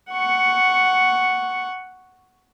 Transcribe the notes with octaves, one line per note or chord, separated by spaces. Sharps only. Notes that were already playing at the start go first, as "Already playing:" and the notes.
F#5 C#6